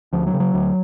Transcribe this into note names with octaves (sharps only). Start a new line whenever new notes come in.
D2 F3
F#3
C#3
F#3
D2